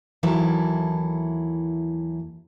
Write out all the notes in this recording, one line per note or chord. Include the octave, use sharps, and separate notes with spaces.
D#2 E3 F#3 E4 A4 A5